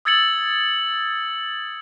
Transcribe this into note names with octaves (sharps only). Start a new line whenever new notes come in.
D#6 E6 G#6 A6 C#7 F#7